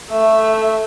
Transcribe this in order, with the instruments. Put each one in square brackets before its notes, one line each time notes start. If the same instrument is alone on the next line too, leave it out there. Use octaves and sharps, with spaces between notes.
[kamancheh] A3 E5